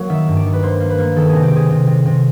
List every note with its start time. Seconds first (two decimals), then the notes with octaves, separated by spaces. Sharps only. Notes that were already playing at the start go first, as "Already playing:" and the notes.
Already playing: F#3 A#3
0.09 D#3 E5
0.28 G2
0.37 D5
0.45 D#3
0.53 B4
0.62 A#3 C5
0.80 A#3
0.89 B4
0.98 A#3
1.16 D#3 A4
1.29 C3 G#4
1.43 G4
1.52 C3 G#4
1.69 C3
1.87 C3
2.05 C3